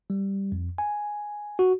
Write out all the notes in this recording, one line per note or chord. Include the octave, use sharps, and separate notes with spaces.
G3
F2
G#5
F#4